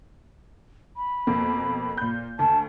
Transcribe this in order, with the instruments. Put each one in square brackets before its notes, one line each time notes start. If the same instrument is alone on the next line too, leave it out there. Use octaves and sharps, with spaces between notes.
[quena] B5
[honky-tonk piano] F2 B2 A#3
A#2 G6
[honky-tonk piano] D2 [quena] A5